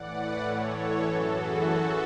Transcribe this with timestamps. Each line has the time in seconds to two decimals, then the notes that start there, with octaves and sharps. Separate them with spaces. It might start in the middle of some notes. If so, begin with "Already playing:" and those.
Already playing: A2 E3 D5 F#5
0.11 B4 D5
0.41 A2 E3 A4 C#5
1.00 F#2 E3 F#4 A4
1.30 E4 G#4
1.59 F#2 E3 F#4 A4